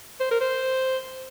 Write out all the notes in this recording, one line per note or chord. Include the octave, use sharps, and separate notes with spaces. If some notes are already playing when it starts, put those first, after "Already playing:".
C5
A#4
C5